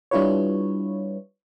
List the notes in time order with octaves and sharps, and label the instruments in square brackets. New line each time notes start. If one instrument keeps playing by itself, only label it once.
[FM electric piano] G3 D4 E4 F4 B4 C#5